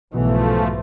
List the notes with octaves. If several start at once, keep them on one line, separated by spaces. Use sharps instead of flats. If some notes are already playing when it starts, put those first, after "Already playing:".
B1 G#2 B2 E3 F3 A3